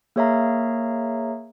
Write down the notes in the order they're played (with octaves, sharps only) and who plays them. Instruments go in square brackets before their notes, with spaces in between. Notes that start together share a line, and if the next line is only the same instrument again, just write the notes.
[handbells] A#3 G#4 C#5 E5 F5 A#5